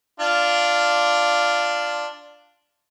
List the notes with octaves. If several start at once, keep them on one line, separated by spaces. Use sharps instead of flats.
D4 F4